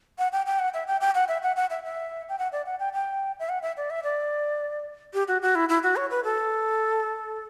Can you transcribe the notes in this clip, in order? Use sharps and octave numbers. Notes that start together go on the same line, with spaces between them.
F#5
G5
G5
F#5
E5
G5
G5
F#5
E5
F#5
F#5
E5
E5
G5
F#5
D5
F#5
G5
G5
E5
F#5
E5
D5
E5
D5
G4
F#4
F#4
E4
E4
F#4
C#5
B4
A4